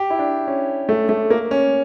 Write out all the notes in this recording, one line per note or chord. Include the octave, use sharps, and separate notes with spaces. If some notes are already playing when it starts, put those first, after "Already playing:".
Already playing: G4
E4
D4
C#4
A3
A3
A#3
C#4